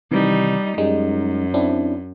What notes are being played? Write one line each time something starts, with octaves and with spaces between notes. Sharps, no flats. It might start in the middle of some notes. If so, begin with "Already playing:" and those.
C3 D#3 E3 G3 D#4
F#2 G3 G#3 D#4
C4 D4 E4